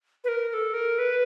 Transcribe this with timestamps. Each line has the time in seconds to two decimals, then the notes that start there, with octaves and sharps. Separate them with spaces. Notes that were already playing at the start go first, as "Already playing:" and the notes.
0.24 B4
0.28 A#4
0.49 A#4
0.53 A4
0.73 A#4
0.98 B4